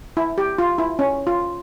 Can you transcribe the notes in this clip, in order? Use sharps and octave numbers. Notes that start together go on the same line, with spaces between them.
E4
G4
F4
E4
C#4
F4